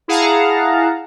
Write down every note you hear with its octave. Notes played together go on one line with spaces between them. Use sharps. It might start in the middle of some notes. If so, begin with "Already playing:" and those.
E4 G#4 F5 F#5 A5 A#5